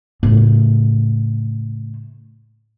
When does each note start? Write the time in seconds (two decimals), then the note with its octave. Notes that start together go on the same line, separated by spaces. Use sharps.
0.23 A2 C#3